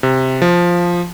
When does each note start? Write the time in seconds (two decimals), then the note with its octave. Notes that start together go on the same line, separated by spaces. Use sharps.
0.03 C3
0.42 F3